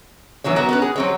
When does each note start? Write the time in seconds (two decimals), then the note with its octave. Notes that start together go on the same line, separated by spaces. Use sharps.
0.44 E3 F#3 B3 C#5
0.56 B3 F#4 A#4
0.69 B3 C#4 B4
0.82 G#4
0.96 F#3 C4 C#5